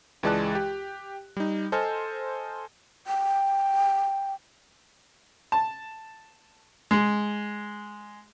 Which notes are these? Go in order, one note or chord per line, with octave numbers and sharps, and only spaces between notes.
C#2 E3 G#3 D5 A5 F#6
G4
G3 D#4
A4 C5 D#5 G#5 F6
G5
A5
G#3